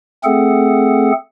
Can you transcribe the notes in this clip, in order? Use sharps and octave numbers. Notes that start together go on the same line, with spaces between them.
A3 C4 G#4 A4 F#5